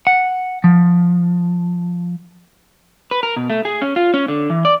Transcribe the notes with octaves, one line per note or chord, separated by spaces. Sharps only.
F#5
F3
B4
A#4
B2
A3
G#4
C#4
F4
C#4
D3
E3
D5